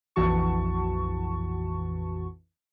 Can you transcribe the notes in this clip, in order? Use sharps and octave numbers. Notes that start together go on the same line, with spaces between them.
A#1 F2 E3 F#4 A5 C#6